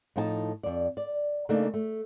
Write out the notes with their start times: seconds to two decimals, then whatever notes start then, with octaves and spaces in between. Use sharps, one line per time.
0.16 A2 F3 D#4 G#5 A5
0.63 F2 D5
0.97 D5
1.49 C#3 A3 A#3 D4 D#4
1.74 A3